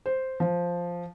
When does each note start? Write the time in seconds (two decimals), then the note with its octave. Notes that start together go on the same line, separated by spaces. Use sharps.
0.06 C5
0.40 F3